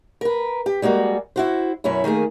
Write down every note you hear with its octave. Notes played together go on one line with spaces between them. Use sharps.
A#4 B4
G4
G3 G#3 A#3 F#4
E4 F#4 C5
F#2 B2 C#4 E4
D#3 A3 A#3 G#4